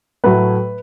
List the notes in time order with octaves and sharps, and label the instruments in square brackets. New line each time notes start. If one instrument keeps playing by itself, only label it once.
[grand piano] A2 F#3 A3 B4